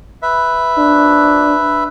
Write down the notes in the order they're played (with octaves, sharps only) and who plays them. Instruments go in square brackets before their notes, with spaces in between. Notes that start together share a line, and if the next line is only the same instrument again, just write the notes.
[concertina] B4 E5
[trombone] D4